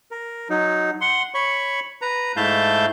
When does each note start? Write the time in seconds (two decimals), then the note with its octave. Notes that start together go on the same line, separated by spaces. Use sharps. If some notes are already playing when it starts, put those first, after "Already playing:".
0.11 A#4
0.50 F#3 D#4
1.01 F#5 C6
1.34 C#5 B5 C#6
2.02 B4 A#5
2.37 G#2 A3 E4 F5 A5 G6